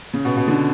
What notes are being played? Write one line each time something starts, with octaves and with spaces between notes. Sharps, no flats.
C#3
B2
B2
D3